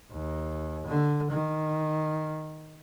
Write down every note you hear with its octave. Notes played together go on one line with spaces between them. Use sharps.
D#2
D3
D#3